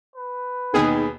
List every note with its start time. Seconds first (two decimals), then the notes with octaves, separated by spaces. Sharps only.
0.16 B4
0.74 D#2 B2 D#4 G#4 G5